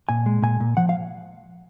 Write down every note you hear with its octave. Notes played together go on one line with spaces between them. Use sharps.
A#2 G#5
G#3
A#2 G#5
A#2
F3 F#5
F5